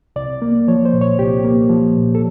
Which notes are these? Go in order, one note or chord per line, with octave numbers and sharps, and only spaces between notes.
C2 D5
A#3
F3 C#5
C5
A#2
C#5
C2 G4
A#3
F3
A#2
A4